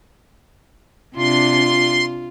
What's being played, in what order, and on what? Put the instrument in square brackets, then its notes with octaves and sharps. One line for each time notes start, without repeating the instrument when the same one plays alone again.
[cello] C3 D4 [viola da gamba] F4 [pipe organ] C6